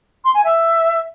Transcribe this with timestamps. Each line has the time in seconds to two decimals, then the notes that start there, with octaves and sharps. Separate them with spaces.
0.24 C6
0.34 G#5
0.44 E5